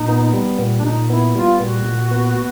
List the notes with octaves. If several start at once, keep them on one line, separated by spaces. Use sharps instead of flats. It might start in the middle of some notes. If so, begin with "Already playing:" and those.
Already playing: A#2 D#4
B3
G3
A#2
D4
A#2 D#4
B3 E4
G3 F4
A#2 F#4
A#2
B3